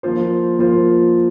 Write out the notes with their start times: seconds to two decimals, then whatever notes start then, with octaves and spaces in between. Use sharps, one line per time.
0.03 F3 A#3 F4 C5
0.59 F3 A#3 F4 C5